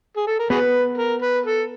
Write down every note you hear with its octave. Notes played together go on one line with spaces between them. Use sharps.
G#4
A4
A#4
B3 F#4 G#4 B4
A#4
B4
A4